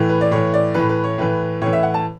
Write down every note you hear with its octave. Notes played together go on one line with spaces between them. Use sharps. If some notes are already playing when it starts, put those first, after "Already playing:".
Already playing: A2 E3
B4
D5
A2 E3 C#5
D5
A2 E3 B4
B4
C#5
A2 E3 B4
A2 E3 C#5
E5
F#5
A5